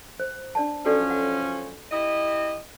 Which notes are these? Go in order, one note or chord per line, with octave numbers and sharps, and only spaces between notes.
C5
D4 D5 A5
F#2 F3 C#4 F#4 A4 D5
F#5
E4 G4 D#5